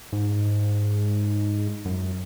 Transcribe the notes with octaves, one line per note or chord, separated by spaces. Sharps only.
G#2
F#2